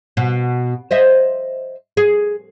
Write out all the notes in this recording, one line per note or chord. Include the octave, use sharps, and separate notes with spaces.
B2
C5 D#5 E5
G#4